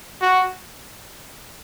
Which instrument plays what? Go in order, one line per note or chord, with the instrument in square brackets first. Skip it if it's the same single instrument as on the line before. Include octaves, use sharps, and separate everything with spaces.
[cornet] F#4